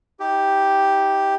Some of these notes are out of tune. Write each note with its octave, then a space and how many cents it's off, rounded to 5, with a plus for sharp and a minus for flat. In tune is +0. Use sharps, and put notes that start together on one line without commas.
D#4 +35 G4 +0